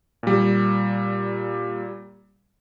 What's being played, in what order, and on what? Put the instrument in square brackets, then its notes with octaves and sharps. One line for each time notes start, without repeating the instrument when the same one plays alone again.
[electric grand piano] A#2 G3